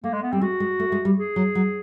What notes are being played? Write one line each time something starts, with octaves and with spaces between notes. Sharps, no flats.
A3 A#3
G#3
B3
G3 C4
G#3 F#4
G#3
A3
G#3
G3
G#4
F#3
F#3